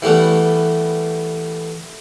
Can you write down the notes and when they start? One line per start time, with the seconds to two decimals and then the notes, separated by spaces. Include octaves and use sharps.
0.02 E3 G3 A3 B3